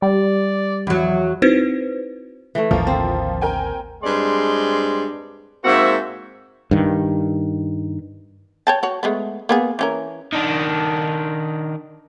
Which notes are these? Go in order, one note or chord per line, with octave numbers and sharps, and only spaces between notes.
G3 D5
E2 F#3
C4 D#4 E4 F#4 B4 C5
E3 A3
A1 D#2 D3 F3 A#3
C4
A#4 G5 G#5
G2 G#3 C4 D5 C6
G#2 A#3 C4 F#4 E5
G2 D#3
C#5 G5 A5
F#4 C#5
G#3 A3 B3
A#3 B3 G#4
E3 C#4 A#4
D#3 D4